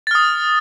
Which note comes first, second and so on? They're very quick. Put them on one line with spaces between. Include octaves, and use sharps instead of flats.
A6 F6 D#6